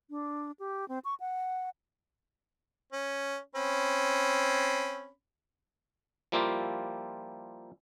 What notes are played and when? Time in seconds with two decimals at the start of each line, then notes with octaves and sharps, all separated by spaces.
0.10 D4
0.59 G4
0.88 C4
1.04 C#6
1.20 F#5
2.92 C#4
3.55 C4 C#4 B5
6.32 F3 G3 A#3 E4 F4 G4